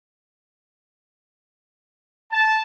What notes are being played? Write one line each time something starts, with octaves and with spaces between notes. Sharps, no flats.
A5